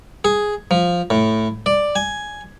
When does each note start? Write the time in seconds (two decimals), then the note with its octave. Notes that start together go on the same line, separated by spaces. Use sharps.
0.24 G#4
0.71 F3
1.10 A2
1.66 D5
1.96 G#5